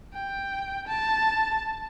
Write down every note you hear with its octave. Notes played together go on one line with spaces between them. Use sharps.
G5
A5